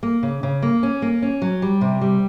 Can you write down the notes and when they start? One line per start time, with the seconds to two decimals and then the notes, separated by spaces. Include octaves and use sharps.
0.03 A#3
0.23 C#3
0.43 C#3
0.62 A#3
0.83 C#4
1.02 A#3
1.22 C#4
1.42 F#3
1.62 G3
1.81 C3
2.01 G3